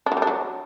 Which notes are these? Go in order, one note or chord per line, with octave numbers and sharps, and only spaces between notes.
D4
F#3
G3
D4
F#3